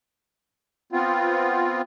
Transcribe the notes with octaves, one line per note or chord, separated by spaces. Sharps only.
B3 C4 F4